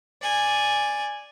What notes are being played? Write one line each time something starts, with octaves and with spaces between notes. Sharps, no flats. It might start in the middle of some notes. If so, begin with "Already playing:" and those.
D5 G#5